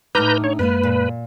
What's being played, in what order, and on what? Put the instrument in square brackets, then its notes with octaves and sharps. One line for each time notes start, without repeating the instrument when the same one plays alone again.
[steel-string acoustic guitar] A2 D#4 [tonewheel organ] B4 A#5 G6 [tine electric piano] D6 F6
[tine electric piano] D4 [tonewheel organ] C#5
[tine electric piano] F#2 G#3 A#3 [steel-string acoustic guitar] B3 D#5 F5 [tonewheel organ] B4
[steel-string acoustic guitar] A#2